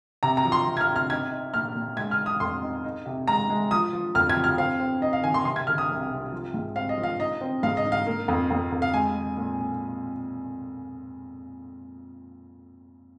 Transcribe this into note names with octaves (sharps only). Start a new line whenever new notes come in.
C3 A#5
A#5
F3
C6
F3
G#6
F6
C3
F6
D#4 G#6
D#4
A#2 F6
A#2
G#3 G#6
F6
D#4
D#6
F2 C6
D#4
D#4
C3
G#3 A#5
G#3
F3 D#6
F3
F2 F6
G#6
F3
F6
C4 F5
C4
D#4 D#5
F5
D#3 G#5
C6
C3 C6
G#6
D#3 F6
D#6
C2
C3
F3
G#2
C4 F5
D#5
F3
F5
D#4 D#5
C4
G#2 F5
D#5
D#4
F5
A#3
F2
F2
F2
F5
G#3 G#5
G#3
A#2
A#2